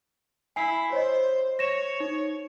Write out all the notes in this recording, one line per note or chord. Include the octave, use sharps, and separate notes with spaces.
E4 G#5 C7
C5 C#5 D#5
C#5 A#6 E7
D#4